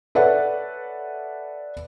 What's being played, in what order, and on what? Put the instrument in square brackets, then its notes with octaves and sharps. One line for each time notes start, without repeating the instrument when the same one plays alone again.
[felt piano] A4 B4 C#5 D5 E5 F#5